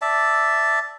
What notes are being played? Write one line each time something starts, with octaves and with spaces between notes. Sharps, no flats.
D5 E5 A5